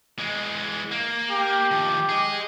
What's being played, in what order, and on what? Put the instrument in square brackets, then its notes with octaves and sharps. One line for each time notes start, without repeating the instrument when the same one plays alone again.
[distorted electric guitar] E3 G#3
A#3
[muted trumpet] G4
[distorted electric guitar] D#3 F3
G#4 D#5